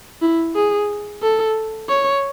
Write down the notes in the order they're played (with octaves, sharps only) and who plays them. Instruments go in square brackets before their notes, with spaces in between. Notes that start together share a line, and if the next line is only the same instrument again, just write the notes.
[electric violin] E4
G#4
A4
C#5